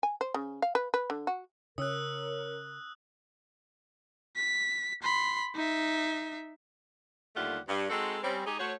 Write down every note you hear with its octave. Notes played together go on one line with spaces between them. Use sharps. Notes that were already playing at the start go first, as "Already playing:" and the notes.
G#5
C5
C#3
F5
B4
B4
D3
F#4
C#3 C#4 A#4 D#6 E6 F#6
B6
B5 C6
D#4 E5
D#2 D3 G3 A3 F4 F#5
G2
G#3 C4 D#4 F#4 A4
G3 C4 C#4
G#3 D#4 G4 G#4
A3 F#4 C5 C#5